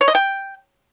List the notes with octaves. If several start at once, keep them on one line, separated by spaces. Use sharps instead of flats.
C#5
D#5
G5